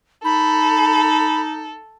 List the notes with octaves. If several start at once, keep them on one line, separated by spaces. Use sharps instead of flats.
D#4 A4 B5